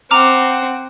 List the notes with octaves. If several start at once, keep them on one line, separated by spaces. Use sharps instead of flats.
C4 F#5 A#5 D6 F6